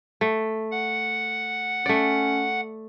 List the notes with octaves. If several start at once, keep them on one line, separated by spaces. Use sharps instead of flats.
A3
F#5
A3 C#4 D5